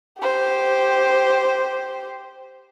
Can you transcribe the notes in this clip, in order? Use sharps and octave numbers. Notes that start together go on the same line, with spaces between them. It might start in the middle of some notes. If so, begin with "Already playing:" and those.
G4 C5